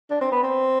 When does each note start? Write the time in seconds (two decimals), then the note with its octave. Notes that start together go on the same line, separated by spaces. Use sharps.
0.10 D4
0.21 C4
0.32 B3
0.43 C4